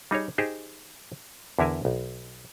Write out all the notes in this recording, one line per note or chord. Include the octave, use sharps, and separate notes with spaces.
G3 D#4 G#4 C#5
D#4 G4 G#4 C5
E2 D3 E4 A#4 G#5
B1